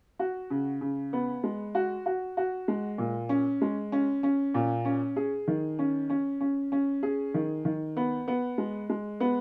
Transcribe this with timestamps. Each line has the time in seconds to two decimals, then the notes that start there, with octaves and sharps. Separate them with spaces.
0.19 F#4
0.50 C#3
0.81 C#3
1.13 B3
1.44 G#3
1.75 F#4
2.06 F#4
2.37 F#4
2.68 G#3
2.98 A#2
3.29 C#4
3.61 G#3
3.92 C#4
4.23 C#4
4.54 A#2
4.85 C#4
5.16 G#4
5.48 D#3
5.79 C#4
6.10 C#4
6.41 C#4
6.72 C#4
7.03 G#4
7.34 D#3
7.65 D#3
7.97 B3
8.28 B3
8.58 G#3
8.90 G#3
9.20 B3